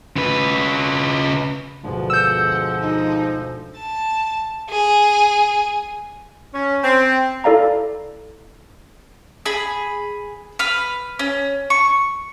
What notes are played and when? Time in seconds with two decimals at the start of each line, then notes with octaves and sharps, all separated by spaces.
0.16 C#3 B4
1.84 D2 G2 B2 F3 G#3
2.10 F#5 E6 G6
2.81 D#4
3.78 A5
4.70 G#4
6.54 C#4
6.84 C4
7.44 E4 A4 D5 F5 A#5
9.46 G#4 B5
10.59 B4 F6
11.19 C#4
11.70 C#6